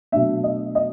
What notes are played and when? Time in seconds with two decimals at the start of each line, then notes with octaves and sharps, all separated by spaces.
0.12 B2 F#3 A3 D4 E5
0.44 D#5
0.75 D#5